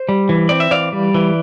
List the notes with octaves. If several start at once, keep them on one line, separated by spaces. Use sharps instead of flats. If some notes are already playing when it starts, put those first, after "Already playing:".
Already playing: C5
G3
E3
C4 D5
E5
E3 D5 F5
G3
E3